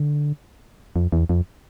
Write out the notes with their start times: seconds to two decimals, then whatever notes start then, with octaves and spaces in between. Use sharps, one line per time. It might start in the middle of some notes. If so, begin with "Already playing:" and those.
Already playing: D3
0.96 F2
1.12 E2
1.29 F2